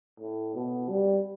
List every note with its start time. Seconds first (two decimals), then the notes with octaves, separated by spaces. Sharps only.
0.20 A2
0.55 B2
0.89 G3